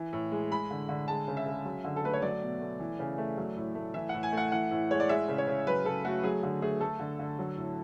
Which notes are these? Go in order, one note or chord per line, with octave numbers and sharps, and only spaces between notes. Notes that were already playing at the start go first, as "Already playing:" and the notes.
Already playing: E3
A2
G#3
G#3 B5
D3
D3
G#3 A5
C#3
E5
C#3
F#3
D3
A4
A3 B4
C#5
F#3 D5
B2
A3
E3
C#3
A3
F#3
A2
A3
E3 E5
A2 F#5
G#5
A3
F#5
E3 F#5
A2
G#3 C#5
D5
G#3 E5
C#3
C#5
C#3
F#3 B4
C#3 A4
A3 F#4
F#3 G#4
D3 G#4
A3 G#4
A3 A4
D3
D3
F#3
A2